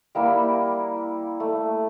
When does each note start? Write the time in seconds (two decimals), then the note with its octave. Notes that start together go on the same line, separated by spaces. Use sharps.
0.15 G3 A#3 E4
1.40 A3